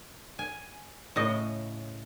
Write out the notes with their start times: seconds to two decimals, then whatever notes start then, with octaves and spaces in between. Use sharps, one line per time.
0.39 G#5
1.16 A2 C#3 D#5